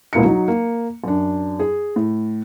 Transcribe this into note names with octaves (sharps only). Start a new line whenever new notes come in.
C#2 B2 A#3 E4 C#7
F#3 D#4
A#3
F#2 D4
G#4
A2